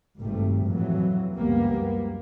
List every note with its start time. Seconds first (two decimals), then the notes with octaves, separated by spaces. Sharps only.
0.18 G#1 G2 C3 G3 A3
0.67 F2 A2 C3 E3 F#3
1.37 C#2 F#2 G3 A#3 B3